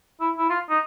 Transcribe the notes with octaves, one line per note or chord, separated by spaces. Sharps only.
E4
E4
F4
D#4